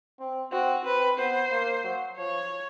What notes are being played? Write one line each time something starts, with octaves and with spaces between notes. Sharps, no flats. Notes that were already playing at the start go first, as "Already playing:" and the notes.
C4
C4 F#4
C4 B4
B3 C5
A#3
F#3
F3 C#5